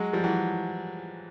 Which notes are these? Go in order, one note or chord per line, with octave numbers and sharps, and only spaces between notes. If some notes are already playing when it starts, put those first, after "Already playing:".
Already playing: F#3 G#3
F3 G3
E3 F#3